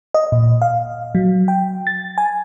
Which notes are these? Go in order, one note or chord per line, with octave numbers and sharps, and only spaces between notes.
D#5
A#2
F5
F#3
G5
A6
G#5